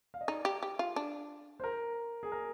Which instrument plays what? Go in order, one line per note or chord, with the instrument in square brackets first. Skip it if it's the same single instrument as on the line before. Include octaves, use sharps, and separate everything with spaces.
[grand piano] F5
D#5
[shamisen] D#4 [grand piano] D5
[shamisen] G4
G4
F4
D4
[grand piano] C5
A#4
G#4
A#4